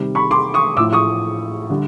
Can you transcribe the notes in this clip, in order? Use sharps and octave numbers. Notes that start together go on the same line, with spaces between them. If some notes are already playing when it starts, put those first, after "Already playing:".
Already playing: C3 D#3 G3
B5 C#6
C6 D6
C#6 D#6
A2 F3 A3 D6 E6
C#6 D#6
D3 G3